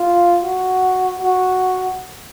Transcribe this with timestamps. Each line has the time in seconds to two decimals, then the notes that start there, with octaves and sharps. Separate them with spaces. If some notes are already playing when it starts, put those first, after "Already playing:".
Already playing: F4
0.43 F#4
1.19 F#4